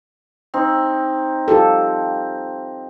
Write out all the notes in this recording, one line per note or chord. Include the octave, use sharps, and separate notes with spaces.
C4 D#4
F4 G4 A4